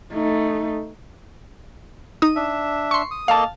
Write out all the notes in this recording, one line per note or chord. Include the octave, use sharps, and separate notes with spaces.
A3 D#4
D#4 D#6
D4 E5
C6 C#6
D#6
A#3 A4 D#5 F5 A5